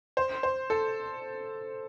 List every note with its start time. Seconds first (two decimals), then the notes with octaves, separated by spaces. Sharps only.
0.17 C5
0.43 C5
0.70 A4